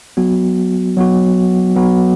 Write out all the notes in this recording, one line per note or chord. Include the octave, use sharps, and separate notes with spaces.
F#3 B3 F#4
F#3 B3 F#4
F#3 B3 F#4